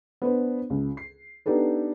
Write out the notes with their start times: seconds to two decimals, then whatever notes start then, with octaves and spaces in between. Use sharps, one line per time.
0.22 B3 D4 B4 C5
0.70 C#2
0.97 C7
1.46 B3 D4 D#4 G4 A4 B4